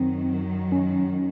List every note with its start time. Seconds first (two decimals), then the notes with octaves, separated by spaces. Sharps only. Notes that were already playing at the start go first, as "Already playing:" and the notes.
Already playing: F#2 D#3 F#3 C4
0.72 C#4